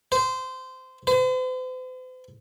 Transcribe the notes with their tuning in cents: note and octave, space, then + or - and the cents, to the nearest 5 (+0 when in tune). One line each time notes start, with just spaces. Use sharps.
C5 -20
C5 -45